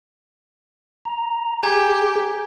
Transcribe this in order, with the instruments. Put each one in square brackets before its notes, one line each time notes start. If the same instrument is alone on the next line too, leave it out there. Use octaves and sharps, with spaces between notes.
[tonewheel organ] A#5
[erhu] G4 [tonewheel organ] G#4 [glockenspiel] G#5 A#5 G#6